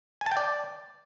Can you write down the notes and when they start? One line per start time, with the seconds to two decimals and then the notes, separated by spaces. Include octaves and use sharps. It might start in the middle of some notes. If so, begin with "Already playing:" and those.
0.21 G#5
0.26 A5
0.32 G5
0.37 D5